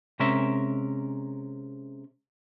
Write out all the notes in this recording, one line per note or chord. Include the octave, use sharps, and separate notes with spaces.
C3 G#3 C#4 A#4 E5